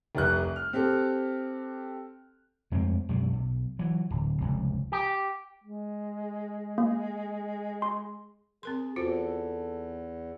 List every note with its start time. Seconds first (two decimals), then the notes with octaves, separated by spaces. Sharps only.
0.15 F1 C2 F#6
0.56 F6
0.73 C4 G4 A4
2.72 F2 G#3 A3 C4
3.09 B1 F#2 G3 G#3
3.33 B1
3.79 E3 F#3
4.11 D1
4.41 F1 C#2
4.92 G4
5.64 G#3
6.78 A#3
7.82 C6
8.63 C4 G#4 A#4 C6
8.96 E2 F4 F#4 A4 C5